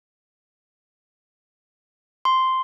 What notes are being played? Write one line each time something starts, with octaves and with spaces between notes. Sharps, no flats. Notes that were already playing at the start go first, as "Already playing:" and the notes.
C6